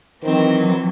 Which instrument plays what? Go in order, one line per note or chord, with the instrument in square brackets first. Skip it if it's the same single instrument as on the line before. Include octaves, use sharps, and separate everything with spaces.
[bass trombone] D#3 [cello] E3 F#3 [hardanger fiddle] C4